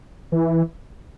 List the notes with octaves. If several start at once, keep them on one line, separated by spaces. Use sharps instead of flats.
E3